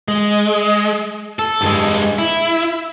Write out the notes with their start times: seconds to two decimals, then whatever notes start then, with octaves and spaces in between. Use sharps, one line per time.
0.08 G#3
1.39 A4
1.61 G2 G#3
2.18 E4